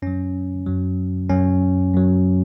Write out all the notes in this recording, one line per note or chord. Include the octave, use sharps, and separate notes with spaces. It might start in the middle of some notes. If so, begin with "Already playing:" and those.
F#2 F#3 C#4
F#2 F#3
F#2 F#3 C#4
F#2 F#3